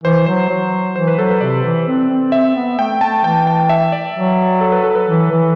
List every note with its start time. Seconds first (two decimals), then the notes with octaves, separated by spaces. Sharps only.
0.03 E3 C5
0.26 F#3 C5
0.49 F#3
0.96 E3 C5
1.07 B4
1.19 F#3 A4
1.30 B4
1.41 C3 D5
1.64 E3
1.87 C4
2.10 C4
2.32 C4 E5
2.56 B3
2.79 A3 G5
3.01 A3 A5
3.24 E3 G5
3.47 G5
3.69 E5
3.92 D5
4.16 F#3
4.61 A4
4.72 B4
4.84 A4
4.95 B4
5.07 E3
5.30 E3